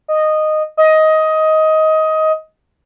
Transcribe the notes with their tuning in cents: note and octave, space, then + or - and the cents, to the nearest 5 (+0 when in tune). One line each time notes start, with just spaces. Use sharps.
D#5 -10
D#5 +15